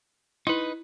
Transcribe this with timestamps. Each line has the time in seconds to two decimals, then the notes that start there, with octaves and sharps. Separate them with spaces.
0.47 D#4 E4 B4